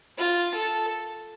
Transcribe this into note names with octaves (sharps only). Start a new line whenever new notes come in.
F4
A4